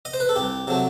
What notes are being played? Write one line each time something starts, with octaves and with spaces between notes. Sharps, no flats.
D#5
C5
B4
A4
C2 G4
C3 F#3 A3